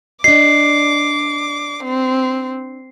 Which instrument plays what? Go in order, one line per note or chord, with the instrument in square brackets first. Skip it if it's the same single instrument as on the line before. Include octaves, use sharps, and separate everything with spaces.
[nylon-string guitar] D4 D#5 [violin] D6 [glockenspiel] C7
[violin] C4